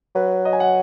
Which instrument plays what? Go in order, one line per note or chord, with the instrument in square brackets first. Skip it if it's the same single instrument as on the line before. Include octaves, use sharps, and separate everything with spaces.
[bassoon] F#3 [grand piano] B4
[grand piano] D#5
G#5
F#5